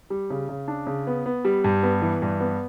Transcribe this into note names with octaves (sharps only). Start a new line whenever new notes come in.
G3
C#3
C#3
D4
C#3
B3
B3
G3
G2
B3
E3
G2
B3